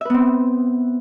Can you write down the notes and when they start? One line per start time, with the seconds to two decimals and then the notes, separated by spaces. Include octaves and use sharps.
0.01 E5
0.05 B4
0.10 B3
0.14 C4